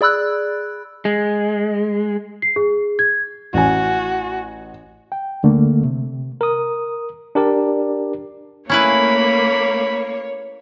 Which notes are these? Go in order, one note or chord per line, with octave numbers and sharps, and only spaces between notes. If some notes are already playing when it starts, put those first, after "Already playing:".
G#4 D5 B5 E6 F#6
G#3
C7
G#4
G#6
A1 F#4 G#5
G5
D2 D3 A3 A#3
C3
A#4 D#6
D4 G4 A#4 D5
A3 A#3 C#4 E4 B4 C#5 B5